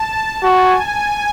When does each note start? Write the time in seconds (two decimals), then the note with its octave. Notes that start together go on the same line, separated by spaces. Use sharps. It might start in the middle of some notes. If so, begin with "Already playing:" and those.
Already playing: A5
0.43 F#4 G#5